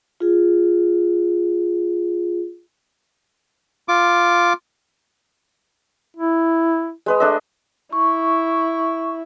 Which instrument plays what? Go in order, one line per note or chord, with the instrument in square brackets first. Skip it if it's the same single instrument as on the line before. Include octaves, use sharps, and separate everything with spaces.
[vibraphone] F4 G#4
[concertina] F4 D6
[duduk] E4
[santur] G#3 B4 D#5
A3 D4 D#5
[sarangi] E4 [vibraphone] C#6